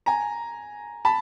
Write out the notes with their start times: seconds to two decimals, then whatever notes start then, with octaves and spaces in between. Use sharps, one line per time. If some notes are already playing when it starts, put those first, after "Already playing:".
0.06 G#5 A#5
1.05 A5 B5